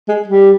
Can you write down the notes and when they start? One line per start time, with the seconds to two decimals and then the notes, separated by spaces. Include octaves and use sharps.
0.08 G#3
0.28 G3